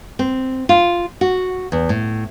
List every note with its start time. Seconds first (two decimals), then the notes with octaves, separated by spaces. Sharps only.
0.19 C4
0.69 F4
1.21 F#4
1.72 E2
1.89 A2